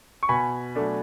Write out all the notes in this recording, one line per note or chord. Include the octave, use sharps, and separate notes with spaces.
C#6
B2 G#5 B5
F#3 A3 D4